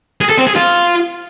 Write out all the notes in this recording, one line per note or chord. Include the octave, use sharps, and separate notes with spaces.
G#4
A4
C4
G#4
F4